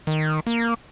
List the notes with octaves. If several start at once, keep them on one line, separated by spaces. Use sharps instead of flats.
D#3
A#3